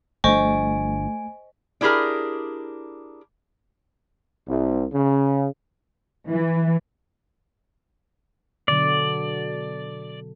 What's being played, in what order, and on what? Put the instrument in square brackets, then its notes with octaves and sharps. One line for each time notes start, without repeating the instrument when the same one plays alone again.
[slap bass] G1 F3 D4 [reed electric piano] A3 [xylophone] C5 D#5 C#6 [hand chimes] G#5
[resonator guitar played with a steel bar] D4 E4 G4 G#4 A#4
[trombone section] C2
C#3
[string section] E3
[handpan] B2 D3 F#3 [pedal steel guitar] D5